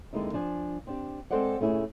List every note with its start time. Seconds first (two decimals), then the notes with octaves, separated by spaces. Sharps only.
0.13 F2 D3 G#3 A#3 D#4 E4
0.34 F3 D4 G#5
0.87 C4 D4 G4
1.31 G#3 C4 A4 C5 D5 F#5
1.60 A#2 A3 C#4 E4 G#4